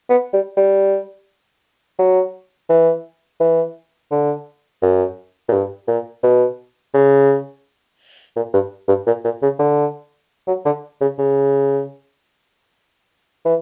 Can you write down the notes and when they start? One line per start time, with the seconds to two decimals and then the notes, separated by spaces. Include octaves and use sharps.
0.09 B3
0.33 G3
0.57 G3
1.99 F#3
2.69 E3
3.40 E3
4.11 D3
4.82 F#2
5.48 A#2
5.53 G2
5.87 A#2
6.23 B2
6.94 C#3
8.36 A#2
8.53 G2
8.88 G2
9.06 A#2
9.24 A#2
9.42 C#3
9.59 D3
10.47 F#3
10.65 D3
11.01 C#3
11.18 C#3
13.45 E3